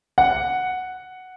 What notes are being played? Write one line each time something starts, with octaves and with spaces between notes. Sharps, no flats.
F#5